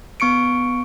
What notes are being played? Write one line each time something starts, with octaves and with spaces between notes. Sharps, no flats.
B3 C#6 C#7 D7